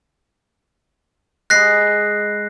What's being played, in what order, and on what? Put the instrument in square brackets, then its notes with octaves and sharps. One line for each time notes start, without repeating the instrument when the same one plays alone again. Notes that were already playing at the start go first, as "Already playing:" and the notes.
[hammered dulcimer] G#3 D#5 B5 [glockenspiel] F#6 A#6 C7